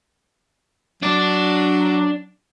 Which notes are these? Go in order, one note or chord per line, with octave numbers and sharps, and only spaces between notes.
F#3 D4 D5